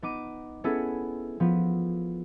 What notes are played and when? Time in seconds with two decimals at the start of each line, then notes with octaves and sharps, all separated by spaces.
0.02 B3 D#4 D6 D#7
0.64 B3 C#4 E4 G#4 A4
1.40 F3 B3